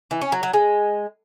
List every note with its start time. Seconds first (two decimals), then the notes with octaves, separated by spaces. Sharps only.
0.11 E3
0.22 C#4
0.32 F#3
0.43 F#3
0.54 G#3